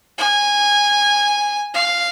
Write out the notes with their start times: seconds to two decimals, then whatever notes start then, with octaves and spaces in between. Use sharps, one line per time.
0.18 G#5
1.74 F5